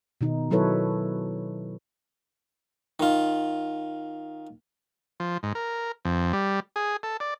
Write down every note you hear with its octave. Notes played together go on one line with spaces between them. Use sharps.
B2 D#3 D#4
D#3 F#3 E4 A4 B4 C#5
D#3 F4
F3
G#2
A#4
F2
G3
G#4
A4
D5